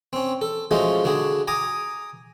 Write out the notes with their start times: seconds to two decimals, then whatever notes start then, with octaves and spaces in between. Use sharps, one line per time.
0.13 C4 C#4
0.41 A4
0.71 F3 G#3 A3 C#4 D#4 F#4
1.04 D3 D4 F#4 G#4
1.48 G#5 A#5 D6 D#6